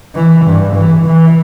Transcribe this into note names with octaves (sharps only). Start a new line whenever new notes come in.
E3
G2
E3
E3